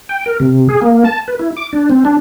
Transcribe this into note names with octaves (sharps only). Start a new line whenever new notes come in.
G5
A#4
C3
G#4
A#3
A5
B4
E4
D6
D4
C4
D4